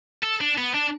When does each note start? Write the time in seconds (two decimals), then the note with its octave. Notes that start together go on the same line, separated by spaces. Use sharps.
0.23 A4
0.41 D4
0.58 B3
0.74 D4